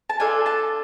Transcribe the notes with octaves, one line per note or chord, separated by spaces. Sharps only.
A5
D4 F4 A4 G#5
A5